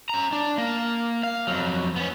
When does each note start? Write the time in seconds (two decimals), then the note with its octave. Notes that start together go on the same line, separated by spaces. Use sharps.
0.10 C#4 A#5
0.33 D4
0.58 A#3
1.23 F5
1.47 F2 F#3
1.96 B3 C#4